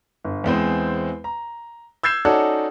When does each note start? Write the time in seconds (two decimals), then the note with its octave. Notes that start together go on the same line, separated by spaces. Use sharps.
0.24 G1
0.44 E2 G#3 C4 C5
1.24 A#5
2.03 E6 G6 G#6 C7 E7
2.25 C#4 D#4 F#4 A4 D5 F#5